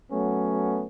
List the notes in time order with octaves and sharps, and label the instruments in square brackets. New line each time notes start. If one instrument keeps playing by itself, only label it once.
[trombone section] F#3 A3 B3 C#4